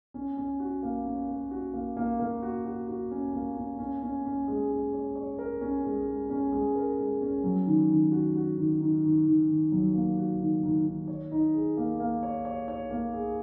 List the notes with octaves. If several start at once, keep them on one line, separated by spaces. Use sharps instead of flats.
C#4
C#4
F#4
A#3
C#4
A#3
F#4
A#3
A#3
A#3
F#4
F#4
F#4
C#4
A#3
C#4
C#4
C#4
C#4
G#3
G#3
C#5
C#5
A#4
C#4
G#3
G#3
C#4
G#3
A#4
G#3
C#4
F#3
D#3
D#3
F#4
F#4
D#3
D#3
D#3
D#3
D#3
F#3
A#3
F#4
D#3
D#3
D#3
C#5
D#4
G#4
A#3
A#3
C#5
C#5
C#5
A#3
G#4